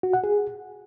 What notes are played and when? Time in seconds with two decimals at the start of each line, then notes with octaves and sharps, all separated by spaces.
0.03 F#4
0.13 F#5
0.24 G#4